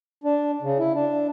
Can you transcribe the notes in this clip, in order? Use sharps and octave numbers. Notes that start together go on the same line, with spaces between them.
D4
C#3
E4
D4